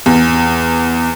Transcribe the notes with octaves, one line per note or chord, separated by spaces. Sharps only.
E2